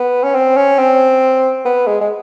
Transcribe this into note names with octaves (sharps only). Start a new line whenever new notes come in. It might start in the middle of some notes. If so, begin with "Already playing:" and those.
Already playing: B3
C#4
C4
C#4
C4
B3
G#3
G#3